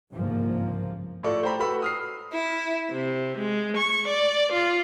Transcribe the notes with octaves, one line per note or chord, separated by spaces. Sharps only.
G1 C2 G#2 C#3 F3 A#3
A2 A3 F4 A4 D5 C#6
A4 C5 G5 A#5 B5
F#4 A4 B4 F#5 B5 E6
D#6 F6 C7
E4
C3
G#3
C#6
D5
F4